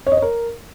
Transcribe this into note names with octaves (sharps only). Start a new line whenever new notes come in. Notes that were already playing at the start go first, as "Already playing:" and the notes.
C#5
D#5
C#5
A#4